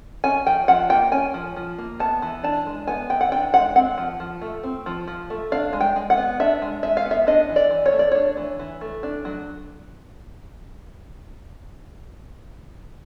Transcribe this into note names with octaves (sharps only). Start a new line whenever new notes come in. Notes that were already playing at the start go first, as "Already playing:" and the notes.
C#4 G#5
F3 G5
F3 F#5
A#3 G5
C#4 G#5
F3
F3
A#3
B3 A5
E3
D4 A5
G#3
B3 G#5
E3 G5
F#5
D4 G5
G#3 F#5
C4 F#5
F3
F3
A3
C4
F3
F3
A3
D4 F5
G#3
G5
G#3
F#5
B3
D4 E5
G#3
G#3 E5
F5
B3
E5
D4 D#5
E3
D5
E3
C#5
A3
D5
D4 C#5
E3
E3
A3
D4
F#3